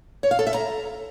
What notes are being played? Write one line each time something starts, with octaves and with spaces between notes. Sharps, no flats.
C#5
F5
A4
E5
A#5